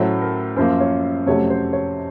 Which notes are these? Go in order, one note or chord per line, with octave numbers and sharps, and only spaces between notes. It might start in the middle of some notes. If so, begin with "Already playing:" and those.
Already playing: A2 F#3 A3 C#4 C5
A#4
F#2 F3 A#3 C5
C#5
F2 C3 F#3 A3 C#4 C#5
C5
C#5